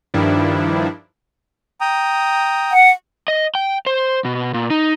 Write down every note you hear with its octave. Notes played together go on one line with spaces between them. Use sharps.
G2 D#3 F3 G3 D4 E4
G5 A#5 D#6
F#5
D#5
G5
C5
B2
A#2
D#4